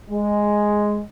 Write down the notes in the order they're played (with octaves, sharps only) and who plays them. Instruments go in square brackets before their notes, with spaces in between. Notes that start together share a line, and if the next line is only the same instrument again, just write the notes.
[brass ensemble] G#3